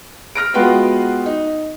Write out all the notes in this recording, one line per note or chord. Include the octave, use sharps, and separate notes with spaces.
F6 A#6 D7
G#3 B3 F4 F#4 B4 G5
D#4